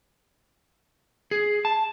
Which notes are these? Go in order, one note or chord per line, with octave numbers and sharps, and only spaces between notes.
G#4
A5